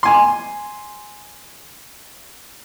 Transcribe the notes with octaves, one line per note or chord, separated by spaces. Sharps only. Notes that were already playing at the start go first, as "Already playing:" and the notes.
G#5 C6